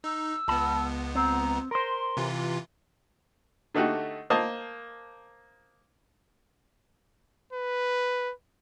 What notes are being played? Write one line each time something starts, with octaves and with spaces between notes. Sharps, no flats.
D#4 E6
C#2 B3 A5 B5
C4 A#5
A#4 C5 C6
C3 E3 F4
D3 A3 D#4 F#4 G4
A#3 C5 D#5 A5
B4